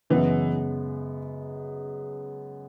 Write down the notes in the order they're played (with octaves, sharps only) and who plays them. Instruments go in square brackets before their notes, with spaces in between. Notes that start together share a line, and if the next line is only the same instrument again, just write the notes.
[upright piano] F#2 C#3 G#3 B3 [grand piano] E3